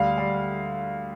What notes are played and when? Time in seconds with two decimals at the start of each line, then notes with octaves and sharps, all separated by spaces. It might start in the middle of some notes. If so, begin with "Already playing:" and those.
Already playing: D2 G3 F5
0.18 G3